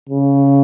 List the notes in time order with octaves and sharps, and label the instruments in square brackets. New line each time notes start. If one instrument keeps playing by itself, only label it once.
[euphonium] C#3